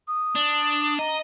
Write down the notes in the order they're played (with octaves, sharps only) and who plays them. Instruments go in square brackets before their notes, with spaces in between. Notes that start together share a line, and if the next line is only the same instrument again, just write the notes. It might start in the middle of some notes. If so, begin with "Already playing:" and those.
[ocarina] D#6
[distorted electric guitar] D4
[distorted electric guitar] D#5 [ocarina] A#5